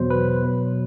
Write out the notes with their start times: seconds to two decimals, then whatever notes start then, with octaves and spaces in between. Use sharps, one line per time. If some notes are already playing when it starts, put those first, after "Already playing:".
Already playing: E2 B2 F#3 C5
0.10 B4
0.42 B2 F#3